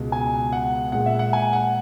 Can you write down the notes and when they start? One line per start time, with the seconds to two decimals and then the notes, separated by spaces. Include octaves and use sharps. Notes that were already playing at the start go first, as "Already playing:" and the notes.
Already playing: C#2 B2 G#3
0.12 G#5
0.53 F#5
0.92 A#2 G#3 F#5
1.06 E5
1.19 F#5
1.33 G#5
1.53 F#5